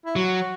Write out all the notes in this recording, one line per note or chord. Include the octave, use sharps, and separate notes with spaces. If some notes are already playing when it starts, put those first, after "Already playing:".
E4
F#3 F#4